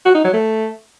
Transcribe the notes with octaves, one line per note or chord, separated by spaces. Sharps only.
F#4
D#4
F#3
A3